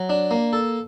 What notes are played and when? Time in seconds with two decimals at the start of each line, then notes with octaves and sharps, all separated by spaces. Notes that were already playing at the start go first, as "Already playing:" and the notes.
Already playing: F#3
0.09 D4
0.31 A#3
0.53 A4